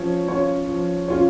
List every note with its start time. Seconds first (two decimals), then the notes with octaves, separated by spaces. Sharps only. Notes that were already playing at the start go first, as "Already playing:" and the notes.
Already playing: F3 C#4 C#5
0.28 C#4 F4 C#5
0.69 F3
1.08 C#4 F4 C#5